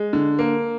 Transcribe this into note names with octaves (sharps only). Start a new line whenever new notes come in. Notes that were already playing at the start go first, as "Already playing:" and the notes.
Already playing: G#3
D3
A#3